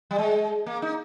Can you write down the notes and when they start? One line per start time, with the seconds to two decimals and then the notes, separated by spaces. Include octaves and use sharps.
0.11 G3
0.18 G#3
0.66 A#3
0.82 D#4